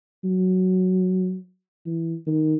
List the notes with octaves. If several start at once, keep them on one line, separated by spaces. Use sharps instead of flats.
F#3
E3
D#3